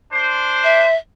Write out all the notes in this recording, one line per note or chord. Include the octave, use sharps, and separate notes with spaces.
D4 C5
E5